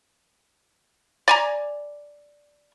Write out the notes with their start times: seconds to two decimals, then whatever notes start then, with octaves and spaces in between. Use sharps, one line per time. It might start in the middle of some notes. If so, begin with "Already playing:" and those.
1.28 D5 G#5 A#5